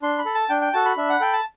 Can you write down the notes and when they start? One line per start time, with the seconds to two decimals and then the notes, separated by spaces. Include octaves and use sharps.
0.02 D4 C6
0.18 B5
0.26 A4
0.35 A5
0.49 D4 G5
0.61 G5
0.73 F#4 A4 A5
0.86 B5
0.97 D4 E5
1.09 F#5
1.20 A4 G5
1.33 A5